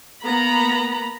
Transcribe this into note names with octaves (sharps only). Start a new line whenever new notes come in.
A#3 B3 A#5 B5